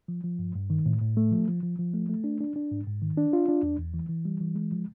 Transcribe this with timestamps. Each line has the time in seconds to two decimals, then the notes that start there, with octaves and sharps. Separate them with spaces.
0.08 F3
0.24 F3
0.39 G2
0.55 G2
0.70 D#3
0.86 A2
1.01 A2
1.17 A3
1.32 F3
1.48 F3
1.63 F3
1.79 F3
1.94 A3
2.09 A3
2.24 D4
2.41 D4
2.56 D4
2.71 G#2
2.86 G#2
3.02 D#3
3.17 D4
3.33 F4
3.48 D4
3.63 E2
3.79 E2
3.94 E3
4.09 E3
4.25 G3
4.40 E3
4.55 G#3
4.72 F3